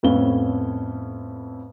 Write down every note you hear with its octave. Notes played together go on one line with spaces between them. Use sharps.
F2 A2 B3 C#4 F5 G7